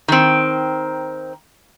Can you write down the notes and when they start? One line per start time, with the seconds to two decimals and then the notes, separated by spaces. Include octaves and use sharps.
0.08 D#3 C4